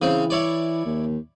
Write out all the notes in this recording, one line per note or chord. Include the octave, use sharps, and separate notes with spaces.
C#3 E3 C4
E4 C#5 D5
D#2